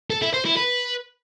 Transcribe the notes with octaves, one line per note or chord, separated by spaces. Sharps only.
A4
E4
C5
E4
B4